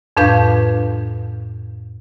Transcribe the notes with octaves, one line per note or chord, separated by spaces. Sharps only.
F2 A2 D4 B4 F5 G6